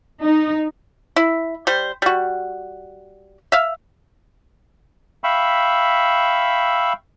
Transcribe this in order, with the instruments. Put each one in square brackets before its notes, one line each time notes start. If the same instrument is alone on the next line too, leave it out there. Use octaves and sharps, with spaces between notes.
[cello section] D#4
[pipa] E4
G3 C5
G3 F#4
E5 F5
[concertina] E5 F5 G5 B5 C#6 E6